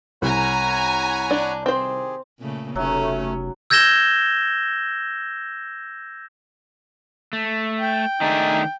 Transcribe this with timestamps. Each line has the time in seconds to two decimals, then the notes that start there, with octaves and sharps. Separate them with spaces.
0.22 C2 C#5 F#5 G#5 A#5 B5
1.31 D4
1.66 D#3 C4 G4 G#4 C5
2.40 A#2 C#3 A3
2.76 F1 F#3 A3 C#4
3.70 E6 G6 G#6 A#6 E7 G7
7.33 A3
7.81 G5
8.21 D#3 A3 D4 D#4 G#5